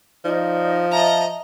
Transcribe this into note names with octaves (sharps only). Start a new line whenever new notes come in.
F3 D#4 D5
D#5 E5 A5 A#5